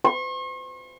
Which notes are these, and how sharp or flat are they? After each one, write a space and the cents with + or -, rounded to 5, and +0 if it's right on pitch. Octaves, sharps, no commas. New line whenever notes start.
C#6 -45